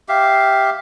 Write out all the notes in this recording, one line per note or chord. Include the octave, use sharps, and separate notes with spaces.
G4 E5 F5